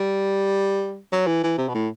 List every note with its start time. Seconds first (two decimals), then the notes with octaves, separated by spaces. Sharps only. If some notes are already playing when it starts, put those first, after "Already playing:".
Already playing: G3
1.12 F#3
1.27 E3
1.43 E3
1.58 C3
1.68 B2
1.74 A2